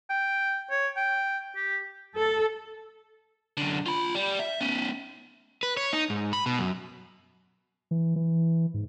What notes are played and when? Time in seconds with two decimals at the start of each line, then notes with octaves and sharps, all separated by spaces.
0.10 G5
0.71 C#5
0.97 G5
1.56 G4
2.15 A4
3.57 F#2 D3
3.86 F4 B5
4.15 G3
4.39 E5
4.61 B3 C#4
5.63 B4
5.77 C#5
5.93 D#4
6.10 G#2
6.33 B5
6.46 B2
6.59 F#2
7.91 E3
8.16 E3
8.74 G#2